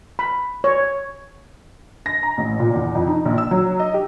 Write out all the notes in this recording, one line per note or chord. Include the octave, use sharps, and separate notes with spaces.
B5
C#5
A#6
A#5
A1
A#2
E2
F2
D#4
A#1
E6
F#3
D#5
G4